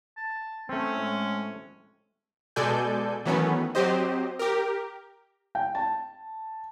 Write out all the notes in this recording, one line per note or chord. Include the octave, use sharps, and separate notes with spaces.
A5
A3 C4 C#4
A2 G#3
B2 G#3 A4 D5 G#5 G6
D#3 E3 F#3 A3 B3 C#4
F#3 C4 G4 C5 D#5
G4 A#4
G5
A5